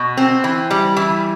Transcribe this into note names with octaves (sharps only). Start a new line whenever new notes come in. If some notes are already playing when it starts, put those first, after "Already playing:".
Already playing: B2
C4
E3
G3
E3